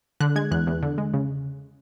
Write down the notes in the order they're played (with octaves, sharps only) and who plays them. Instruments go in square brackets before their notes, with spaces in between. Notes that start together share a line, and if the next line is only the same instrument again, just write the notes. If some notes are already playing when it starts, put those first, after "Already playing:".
[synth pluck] D3 F#6
G#3 G#6
E2 F#6
E2
D3
G#3
C#3